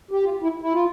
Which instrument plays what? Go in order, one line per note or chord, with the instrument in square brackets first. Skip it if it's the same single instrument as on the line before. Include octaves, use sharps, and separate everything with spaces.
[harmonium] G4
F4
E4
E4
F4